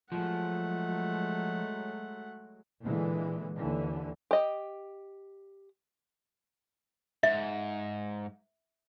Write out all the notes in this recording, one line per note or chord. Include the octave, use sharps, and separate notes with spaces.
F3 F#3 G#3 A3 F#5
A#2 D3 E3 G#3
D#2 D3 E3
G4 D#5
G#2 E5